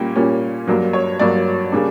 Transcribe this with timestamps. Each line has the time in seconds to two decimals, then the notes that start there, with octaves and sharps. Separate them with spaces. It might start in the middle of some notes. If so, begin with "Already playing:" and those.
Already playing: A#2 G3 A#3 C#4 G5
0.16 A#2 G3 A#3 C#4
0.68 G2 F#3 A#3
0.93 C#5
1.19 G2 F#3 A#3 D5
1.72 C#3 G3 A#3 D4